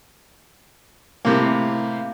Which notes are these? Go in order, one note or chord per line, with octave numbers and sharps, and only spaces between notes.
A2 C3 A#3